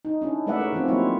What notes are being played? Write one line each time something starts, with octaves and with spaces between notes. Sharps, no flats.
D#4
C#4 D4 E4
G#3 A3 B4 D5 E5 F#5
A#4 C#5
D#3 F3 C4 C#4 F4
F#3 A#3 C4 E4 F4 C#5